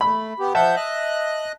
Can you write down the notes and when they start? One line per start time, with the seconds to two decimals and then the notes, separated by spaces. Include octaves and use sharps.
0.01 A3 B5
0.40 B3 G4
0.55 F3 E5 F#5 A5 G6
0.76 D#5 F#6